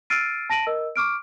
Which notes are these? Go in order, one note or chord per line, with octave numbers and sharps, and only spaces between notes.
E6 F6 A6 C7 D7 D#7
A5 A#6 D7 D#7 F#7
A#4 D#5 E6
C#6 D6 F6 D7